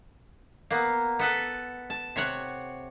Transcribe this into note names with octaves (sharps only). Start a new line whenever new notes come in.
A#3 B3
B3 A4 B4
A5
C3 C#5 F#5